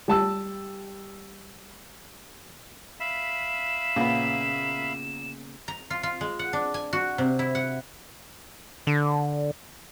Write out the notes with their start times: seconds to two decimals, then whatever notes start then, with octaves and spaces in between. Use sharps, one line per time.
0.08 G3 A5 E6
3.00 E5 F5 B5 E7
3.96 A#2 C#3 B3
5.68 A#5
5.90 F4
6.03 F4
6.21 G#3
6.39 F#5
6.53 D4
6.74 G#5
6.93 F#4
7.18 C3
7.39 E4
7.55 F#5
8.87 D3